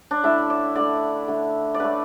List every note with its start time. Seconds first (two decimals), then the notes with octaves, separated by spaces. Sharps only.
0.11 D4
0.23 D3 A3 E4
0.50 D5
0.75 D3 A3 D5
1.28 D3 A3
1.74 D5
1.80 D3 A3 B4